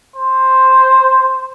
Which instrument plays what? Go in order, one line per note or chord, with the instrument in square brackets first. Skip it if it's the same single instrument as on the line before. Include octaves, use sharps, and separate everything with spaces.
[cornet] C5